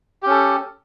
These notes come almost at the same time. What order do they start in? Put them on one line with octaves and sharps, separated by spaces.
G4 C#4 A4